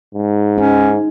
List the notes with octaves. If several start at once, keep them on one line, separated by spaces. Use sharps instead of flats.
G#2
C#4 D#4